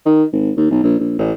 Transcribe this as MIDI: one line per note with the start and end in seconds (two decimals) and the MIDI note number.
0.05 0.24 51
0.33 0.51 32
0.57 0.67 39
0.70 0.81 35
0.83 0.95 34
0.99 1.15 34
1.18 1.31 33